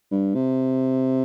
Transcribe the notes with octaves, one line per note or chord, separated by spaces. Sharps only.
G2
C3